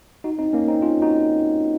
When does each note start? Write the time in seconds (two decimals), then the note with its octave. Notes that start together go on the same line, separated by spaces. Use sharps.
0.24 D#4 F#4
0.38 C4 D#4
0.53 A#3 C#4
0.68 C4 D#4
0.82 C#4 F4
1.02 D#4 F#4